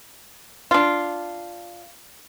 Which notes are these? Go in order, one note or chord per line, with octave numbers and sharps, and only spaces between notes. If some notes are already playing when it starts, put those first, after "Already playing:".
D4 F4